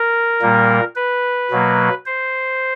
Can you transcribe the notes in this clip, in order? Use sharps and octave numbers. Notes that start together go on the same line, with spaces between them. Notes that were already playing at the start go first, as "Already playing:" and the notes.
Already playing: A#4
A#2 G3 A#3
B4
B2 F#3 A#3
C5